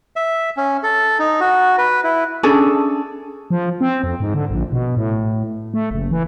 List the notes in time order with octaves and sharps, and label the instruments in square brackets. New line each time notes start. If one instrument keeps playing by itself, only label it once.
[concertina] E5
C#4
A4
D#4
F#4
B4
E4
[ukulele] C#4 D4 G#4 A4
[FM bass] F3
C4
F2
G#2
D3
A#1
B2
A2
A3
F#1
E3